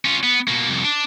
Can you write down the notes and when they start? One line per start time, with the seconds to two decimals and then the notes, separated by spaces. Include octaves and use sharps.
0.05 C#4 F4
0.23 B3
0.48 B2 A#3
0.69 C2 F2
0.84 D4